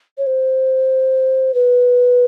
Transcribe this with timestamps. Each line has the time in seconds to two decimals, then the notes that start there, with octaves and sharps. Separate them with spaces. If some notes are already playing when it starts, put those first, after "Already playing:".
0.18 C#5
0.27 C5
1.54 B4